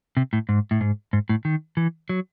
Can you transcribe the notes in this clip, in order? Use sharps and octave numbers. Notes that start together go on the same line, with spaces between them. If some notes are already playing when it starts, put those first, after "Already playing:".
C3
A2
G#2
A2
G#2
G#2
A2
D#3
E3
F#3